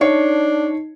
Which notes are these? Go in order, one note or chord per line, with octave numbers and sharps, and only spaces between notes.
D4 D#4 C#5 C7